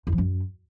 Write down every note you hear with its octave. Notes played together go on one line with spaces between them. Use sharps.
E2
F3
F#2